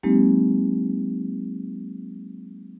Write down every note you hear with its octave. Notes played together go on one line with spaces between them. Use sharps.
F#3 G#3 A#3 C4 D#4 G4